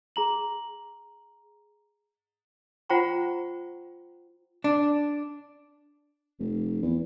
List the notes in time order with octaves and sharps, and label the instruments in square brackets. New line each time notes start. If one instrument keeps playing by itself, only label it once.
[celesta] G#4 A#5 F#7
[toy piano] F4 C5 F#5 G5 A#5 C#6
[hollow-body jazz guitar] D4
[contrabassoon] F1
E2